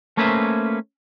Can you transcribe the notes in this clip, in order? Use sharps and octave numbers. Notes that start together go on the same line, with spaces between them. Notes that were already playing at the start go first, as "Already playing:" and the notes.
A3 A#3 C#4 B4 C5 E5